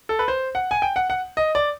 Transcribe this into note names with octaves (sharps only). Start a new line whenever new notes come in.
A4
B4
C5
F#5
G#5
G5
F#5
F#5
D#5
D5